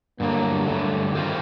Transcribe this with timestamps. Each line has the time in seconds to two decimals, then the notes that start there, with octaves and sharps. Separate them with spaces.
0.20 G2 D3 F#3 A#3
0.66 G2 D3 F#3 A3
1.14 D#3 G3 C4 F4